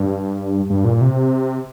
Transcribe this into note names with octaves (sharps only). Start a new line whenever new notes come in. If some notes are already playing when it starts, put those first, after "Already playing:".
Already playing: G2
G2
A#2
C3